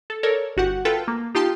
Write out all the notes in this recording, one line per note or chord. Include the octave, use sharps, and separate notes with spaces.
A4
A4 A#4 C#5 D5
G1 F#4 G4 F#5
F4 A4 B4 G5 A5
A#3
D#4 F4 G4 G5 A5 C6